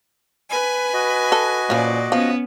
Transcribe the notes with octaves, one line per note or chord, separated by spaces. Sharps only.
B4 G#5 B5
F#4 D#5
A4
A#2 F3 C#4 D5
F3 B3 C#4